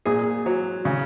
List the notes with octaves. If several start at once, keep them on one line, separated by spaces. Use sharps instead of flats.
A#2 G#4
F#3
C#3